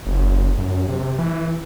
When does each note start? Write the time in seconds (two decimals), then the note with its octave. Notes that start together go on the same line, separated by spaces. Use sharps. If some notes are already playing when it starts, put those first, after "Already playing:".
0.07 F#1
0.58 F#2
0.89 C3
1.19 E3